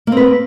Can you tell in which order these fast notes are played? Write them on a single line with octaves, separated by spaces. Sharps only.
A#3 C4 B4